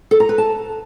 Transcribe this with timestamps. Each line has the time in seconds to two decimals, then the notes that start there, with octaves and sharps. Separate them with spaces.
0.11 A4
0.20 A#5
0.29 B4
0.38 A5